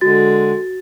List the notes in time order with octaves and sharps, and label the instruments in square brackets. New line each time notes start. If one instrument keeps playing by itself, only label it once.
[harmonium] D3 G#3 [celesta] F#4 A6